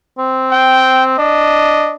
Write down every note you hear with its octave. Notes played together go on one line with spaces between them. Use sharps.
C4
G5
D4 D#5